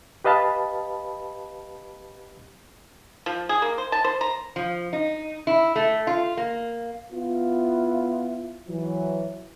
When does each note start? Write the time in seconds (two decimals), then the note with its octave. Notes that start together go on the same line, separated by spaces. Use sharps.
0.24 G4 B4 D#5 F5 A5 B5
3.26 F3
3.49 G#4
3.62 A#3
3.78 C5
3.92 A5
4.04 C5
4.21 A#5
4.56 F3
4.93 D#4
5.47 E4
5.76 A3
6.07 F4
6.37 A#3
7.12 B3 E4 F4
8.67 E3 F#3